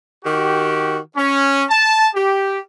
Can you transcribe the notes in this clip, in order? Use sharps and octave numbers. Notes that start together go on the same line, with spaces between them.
D#3 F#4 G4
C#4
A5
G4